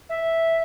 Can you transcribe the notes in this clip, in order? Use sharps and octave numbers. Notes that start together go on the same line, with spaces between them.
E5